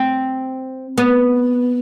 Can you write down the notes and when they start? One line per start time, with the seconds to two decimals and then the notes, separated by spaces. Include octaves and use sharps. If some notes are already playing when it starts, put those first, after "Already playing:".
Already playing: C4
0.98 B3